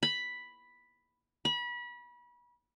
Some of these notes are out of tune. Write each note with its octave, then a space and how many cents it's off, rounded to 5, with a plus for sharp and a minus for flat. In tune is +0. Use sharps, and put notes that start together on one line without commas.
B5 +0
B5 -30